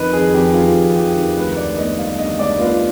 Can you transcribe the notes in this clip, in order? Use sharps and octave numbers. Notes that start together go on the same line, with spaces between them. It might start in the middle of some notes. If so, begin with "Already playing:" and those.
Already playing: F2 D#3 B4 D#5
F2 G#4
F2 G4
F2 F4
F2
F2 G4
D#3
D2 B4
D2 D5
B3 D#5
G3 F5
D3 D#5
D2 D5
B3 F4